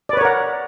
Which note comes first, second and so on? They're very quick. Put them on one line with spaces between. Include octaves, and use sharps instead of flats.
D5 B4 C#5 A#4 F#5